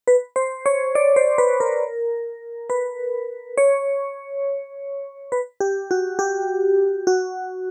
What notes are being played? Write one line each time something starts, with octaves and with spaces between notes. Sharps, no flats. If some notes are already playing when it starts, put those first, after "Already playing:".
B4
C5
C#5
D5
C5
B4
A#4
B4
C#5
B4
G4
F#4
G4
F#4